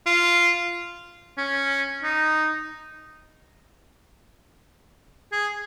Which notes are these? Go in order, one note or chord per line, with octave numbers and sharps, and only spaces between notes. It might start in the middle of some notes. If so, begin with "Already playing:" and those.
F4
C#4
D#4
G#4